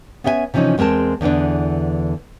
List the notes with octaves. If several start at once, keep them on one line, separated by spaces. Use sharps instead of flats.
B3 C#4 B4 E5 G5 G#5
C3 E3 F3 C#4 D#4
E2 G#3 C4 A#4 A5
E2 D3 E3 B3 D4